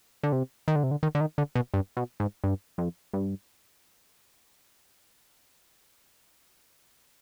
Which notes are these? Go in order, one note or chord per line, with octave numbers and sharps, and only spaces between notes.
D3
C3
D#3
D3
C3
D3
D#3
D3
D#3
D3
B2
G2
B2
G#2
G2
F2
G2